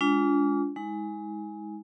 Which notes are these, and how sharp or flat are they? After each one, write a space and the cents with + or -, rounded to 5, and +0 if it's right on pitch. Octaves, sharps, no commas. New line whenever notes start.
G#3 +0 D4 -35 F4 +0
G#3 +0 D#4 +45